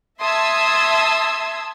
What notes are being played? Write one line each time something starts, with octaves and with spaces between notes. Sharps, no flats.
E5 A5 C6 D#6 E6 G#6